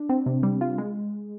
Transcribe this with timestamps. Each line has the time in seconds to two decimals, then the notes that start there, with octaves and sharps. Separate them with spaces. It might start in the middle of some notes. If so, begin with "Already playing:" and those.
Already playing: D4
0.09 C4
0.26 C3
0.43 G3
0.61 F4
0.78 G#3